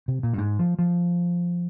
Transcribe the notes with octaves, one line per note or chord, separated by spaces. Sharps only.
C3
A#2
G2
G#2
F3
F3